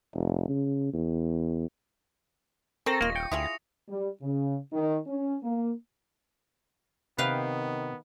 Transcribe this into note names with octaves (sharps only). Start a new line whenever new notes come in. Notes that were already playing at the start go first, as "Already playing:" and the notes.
F1
C#3
E2
C4 A4 A#4 A#5 C#6 A#6
D#1 A#3 F4 D#5
G5 C#7
D2 E4 F4 G#4 D#6 F7
G3
C#3
D#3
C#4
A#3
C3 D#3 B3 B4 F5 G5